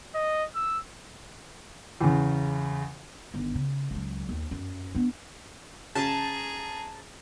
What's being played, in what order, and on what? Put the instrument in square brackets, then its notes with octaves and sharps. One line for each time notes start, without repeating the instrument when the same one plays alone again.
[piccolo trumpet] D#5
E6
[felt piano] E2 C#3
[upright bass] G1 D#3
C#3
C#2 F#3
D#2
F#2
B3 D4
[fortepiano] C#3 [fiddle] G#4 A#5 [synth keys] A5